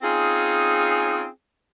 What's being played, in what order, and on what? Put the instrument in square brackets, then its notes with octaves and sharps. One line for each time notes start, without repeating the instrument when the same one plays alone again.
[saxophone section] C4 C#4 D#4 F4 G#4